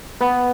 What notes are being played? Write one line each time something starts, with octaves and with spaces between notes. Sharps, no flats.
B3